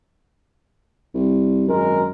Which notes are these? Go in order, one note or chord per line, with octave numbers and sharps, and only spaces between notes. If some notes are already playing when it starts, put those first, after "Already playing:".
C2
G#1 F#2 G#3 A#4